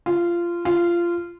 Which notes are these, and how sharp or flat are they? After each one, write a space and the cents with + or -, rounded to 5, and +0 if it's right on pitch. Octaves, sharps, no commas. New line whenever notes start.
F4 -20
F4 -20